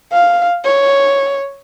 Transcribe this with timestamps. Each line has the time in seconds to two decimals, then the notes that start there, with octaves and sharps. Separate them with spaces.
0.13 F5
0.64 C#5